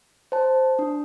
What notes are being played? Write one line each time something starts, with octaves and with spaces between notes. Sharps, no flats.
C5 A5
D4